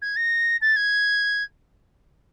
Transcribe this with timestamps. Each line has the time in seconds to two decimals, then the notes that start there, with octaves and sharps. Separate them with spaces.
0.02 G#6
0.16 A#6
0.62 A6
0.76 G#6